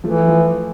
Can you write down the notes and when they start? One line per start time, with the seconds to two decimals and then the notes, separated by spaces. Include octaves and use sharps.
0.04 E3 F3 A3
0.27 F3